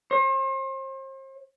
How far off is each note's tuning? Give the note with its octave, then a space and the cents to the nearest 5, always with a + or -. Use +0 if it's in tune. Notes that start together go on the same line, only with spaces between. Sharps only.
C5 +40